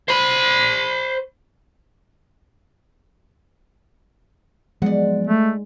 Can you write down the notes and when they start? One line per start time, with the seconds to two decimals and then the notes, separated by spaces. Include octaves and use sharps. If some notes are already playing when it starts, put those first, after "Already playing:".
0.09 C5 B5
4.82 F3 F#3 G#3 B3 D5 F#5
5.27 A3